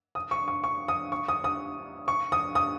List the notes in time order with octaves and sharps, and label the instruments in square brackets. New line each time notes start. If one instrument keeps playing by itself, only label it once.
[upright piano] D#6
C#6
C#6
C#6
D#6
C#6
D#6
D#6
C#6
D#6
D#6